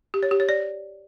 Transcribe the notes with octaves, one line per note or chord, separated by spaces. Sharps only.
G4
C#5
G4
C#5
D5